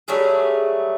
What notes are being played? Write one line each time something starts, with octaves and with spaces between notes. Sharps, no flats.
F#3 G3 A3 G#4